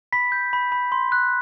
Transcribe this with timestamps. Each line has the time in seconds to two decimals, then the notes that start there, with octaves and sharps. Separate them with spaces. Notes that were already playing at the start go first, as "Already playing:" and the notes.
0.13 B5 B6
0.32 G6
0.53 B5
0.72 B5
0.92 C6
1.12 F#6